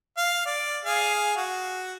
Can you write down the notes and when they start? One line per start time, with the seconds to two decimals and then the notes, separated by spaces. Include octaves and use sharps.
0.17 F5
0.46 D5
0.85 G#4 F5
1.37 F#4